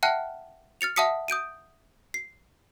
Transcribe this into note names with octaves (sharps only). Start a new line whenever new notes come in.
E5 F#5 G5 A5 F6 F#6
F6 A6 C#7 F7
E5 F#5 A5 D#6 B6 C#7
D#6 G6 D7 D#7
C7